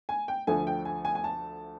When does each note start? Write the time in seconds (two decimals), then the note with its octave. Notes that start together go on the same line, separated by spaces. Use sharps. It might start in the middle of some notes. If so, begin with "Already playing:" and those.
0.09 G#5
0.28 G5
0.47 D2 D3 F3 A3 G#5
0.67 G5
0.85 G#5
1.05 G#5
1.15 G#5
1.24 A5